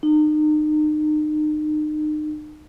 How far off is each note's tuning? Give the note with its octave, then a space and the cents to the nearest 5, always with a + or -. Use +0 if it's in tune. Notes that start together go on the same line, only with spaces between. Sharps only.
D#4 -35